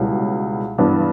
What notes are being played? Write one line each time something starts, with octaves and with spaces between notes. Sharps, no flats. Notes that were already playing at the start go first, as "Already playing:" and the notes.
Already playing: C#2 B2 G3 C#4 E4
G2 E3 B3 D4